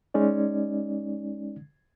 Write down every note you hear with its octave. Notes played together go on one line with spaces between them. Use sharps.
G#3 C#4 D#4 D5